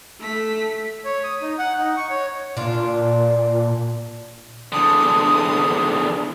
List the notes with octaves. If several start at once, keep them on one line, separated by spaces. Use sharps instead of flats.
A3 B6
C#5
D#6
D#4
F#5
D#4
C#6
C#5
A#2 D4 F4
E2 D3 D#6